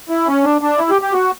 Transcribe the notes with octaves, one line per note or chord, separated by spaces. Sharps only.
E4
C#4
D4
D4
E4
G4
G4
F#4